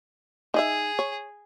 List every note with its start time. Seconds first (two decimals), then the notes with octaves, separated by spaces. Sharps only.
0.54 D#4 G#4 D#5 E5
0.99 C#5